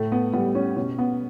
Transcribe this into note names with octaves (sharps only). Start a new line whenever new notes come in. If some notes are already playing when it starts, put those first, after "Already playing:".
Already playing: A2 A3
B3
G3 B3
C#4
B2 C#4
B3